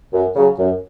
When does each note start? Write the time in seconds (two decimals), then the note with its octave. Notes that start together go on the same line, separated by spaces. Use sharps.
0.13 F#2
0.35 C#3 F#3
0.58 F#2